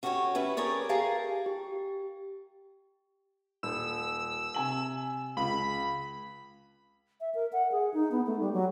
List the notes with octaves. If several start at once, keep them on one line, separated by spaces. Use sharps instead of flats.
C#4 F#4 G4 A4 B4 C#5
E3 A3 C#4 E4 B4
G4 G#4 A#4 C#5 D5
G4 G#4 A#4 F5 G#5 A5
G4
D#1 E6
C3 G#5 F#7
C#2 B5
E5
A#4
F#5
G#4
D#4
B3
A3
G3
F#3